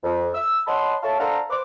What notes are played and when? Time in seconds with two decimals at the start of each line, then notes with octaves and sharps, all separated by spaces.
0.03 F2
0.34 E6
0.67 C#5 D#5 F#5 A5 B5 C6
1.03 A4 C#5 E5 F5 A5
1.19 D4 A4 C5 F5 F#5 A#5
1.50 B4 C5 D6